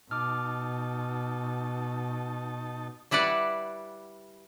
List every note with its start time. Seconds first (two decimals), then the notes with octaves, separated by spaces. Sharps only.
0.11 B2 D#4 A5 D6 F6
3.11 G3 E4 B4 D5 F#5